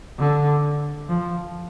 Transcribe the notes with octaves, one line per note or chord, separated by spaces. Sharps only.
D3
F3